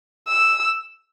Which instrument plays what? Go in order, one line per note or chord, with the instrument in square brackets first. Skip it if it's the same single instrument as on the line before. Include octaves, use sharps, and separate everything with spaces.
[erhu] E6